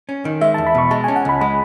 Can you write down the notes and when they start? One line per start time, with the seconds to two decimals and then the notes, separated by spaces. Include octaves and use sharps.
0.09 C#4
0.25 D#3
0.41 G#3 E5
0.54 E2 A5
0.67 B5
0.75 B2 C#6
0.91 G#3 A5
1.04 C#4 G#5
1.16 F#5
1.25 C#2 B5
1.41 G#3 B5